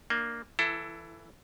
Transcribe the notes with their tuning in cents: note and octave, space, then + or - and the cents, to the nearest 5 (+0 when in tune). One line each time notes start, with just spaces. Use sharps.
A#3 +0 D4 +30
E3 +0 E4 +25 A4 +10